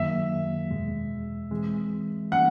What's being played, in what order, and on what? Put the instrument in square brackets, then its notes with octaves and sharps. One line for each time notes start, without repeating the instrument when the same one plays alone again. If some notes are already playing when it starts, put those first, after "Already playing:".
Already playing: [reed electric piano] F#2 D#3 F#3 A#3 [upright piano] E5
[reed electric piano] E2 B2 G#3
E3 G#3 C4
[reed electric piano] E3 G3 A#3 C#4 [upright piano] F#5